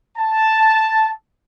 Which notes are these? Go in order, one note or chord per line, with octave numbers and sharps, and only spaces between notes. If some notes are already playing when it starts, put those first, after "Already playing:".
A5